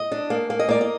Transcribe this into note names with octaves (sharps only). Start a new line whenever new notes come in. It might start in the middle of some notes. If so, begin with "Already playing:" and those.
Already playing: D#5
D4
A#3
A#3
D#5
A#3 D5
D#5